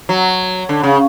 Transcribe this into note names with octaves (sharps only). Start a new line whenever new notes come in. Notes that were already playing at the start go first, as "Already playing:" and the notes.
F#3
D3
C#3